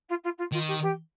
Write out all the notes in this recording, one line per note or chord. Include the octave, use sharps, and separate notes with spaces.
F4
F4
F4
D#3 F4
G4
G4